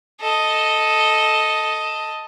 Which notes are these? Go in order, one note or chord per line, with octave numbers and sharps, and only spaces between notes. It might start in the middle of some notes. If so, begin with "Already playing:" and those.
A4 D#5